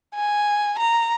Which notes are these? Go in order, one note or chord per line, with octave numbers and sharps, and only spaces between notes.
G#5
A#5